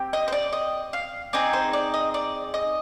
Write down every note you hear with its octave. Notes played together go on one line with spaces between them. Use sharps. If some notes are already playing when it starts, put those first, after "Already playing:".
Already playing: C4 G4
D#5
C5
D5
D#5
F5
C4 D#4 G#4 D5
C5
D5
D#5
D5
D#5